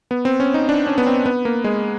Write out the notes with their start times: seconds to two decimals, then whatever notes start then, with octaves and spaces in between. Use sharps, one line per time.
0.11 B3
0.25 C4
0.40 C#4
0.54 D#4
0.69 D4
0.87 C#4
0.98 B3
1.07 C4
1.26 B3
1.45 A#3
1.64 G#3